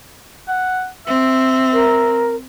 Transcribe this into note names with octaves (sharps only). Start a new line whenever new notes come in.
F#5
C4 E5
A#4